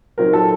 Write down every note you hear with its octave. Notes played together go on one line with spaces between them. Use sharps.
A#2 F#3 C4 D#4 A#4
A4